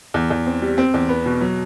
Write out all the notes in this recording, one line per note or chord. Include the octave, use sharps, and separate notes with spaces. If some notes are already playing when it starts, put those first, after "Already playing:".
E2
E2
C4
G3
C4
E2
B3
B2
F#3